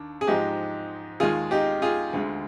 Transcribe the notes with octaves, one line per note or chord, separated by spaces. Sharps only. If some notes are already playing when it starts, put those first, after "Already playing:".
Already playing: D#2 D4
G#4
G#2 F3 G#3 D#4 G4
D#2 D#3 G#3 F4 G#4
D#4 G4
F4 G#4
D2 D3 G#3